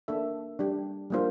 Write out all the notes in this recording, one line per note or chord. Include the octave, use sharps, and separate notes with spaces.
A#3 D4 A4 E5
G3 D4 G4
G3 A#3 D4 F4 C5